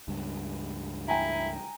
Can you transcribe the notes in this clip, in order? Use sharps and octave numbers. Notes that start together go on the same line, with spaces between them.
C#2 G2
E4 G5 G#5 A#5